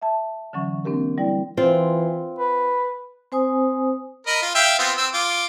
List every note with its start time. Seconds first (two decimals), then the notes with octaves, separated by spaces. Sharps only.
0.02 E5 A5
0.53 D3 E3 F#3 C#4 C#6
0.85 A#3 C4 D4 G4 A#4
1.18 G3 E4 D5 G5
1.57 E3 C4 F4
2.39 B4
3.32 C4 C5 G#5 D#6
4.27 A#4 D#5 B5
4.42 F4
4.55 E5 F5 G5
4.79 B3 C4 F4
4.97 C4 E6
5.14 F4 D6